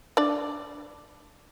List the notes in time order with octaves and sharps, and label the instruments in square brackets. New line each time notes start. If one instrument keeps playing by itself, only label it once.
[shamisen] D4 D5